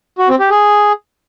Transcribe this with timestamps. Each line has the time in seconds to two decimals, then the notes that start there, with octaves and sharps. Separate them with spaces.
0.18 F#4
0.29 C4
0.39 G4
0.50 G#4